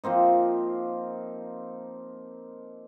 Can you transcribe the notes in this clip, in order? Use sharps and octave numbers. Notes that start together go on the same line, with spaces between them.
F3 A#3 C4 D#4